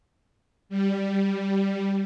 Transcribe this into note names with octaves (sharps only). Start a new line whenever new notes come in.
G3